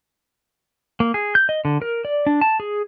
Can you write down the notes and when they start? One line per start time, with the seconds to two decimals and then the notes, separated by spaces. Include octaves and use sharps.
1.00 A#3
1.14 G#4
1.35 G6
1.49 D#5
1.65 D3
1.82 A#4
2.05 D5
2.27 D4
2.41 A5
2.60 G#4